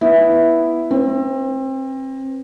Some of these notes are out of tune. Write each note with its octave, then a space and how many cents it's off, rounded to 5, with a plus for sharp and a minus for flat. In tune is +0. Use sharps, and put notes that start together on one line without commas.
B3 +0 E4 +0
C4 +30 B4 +5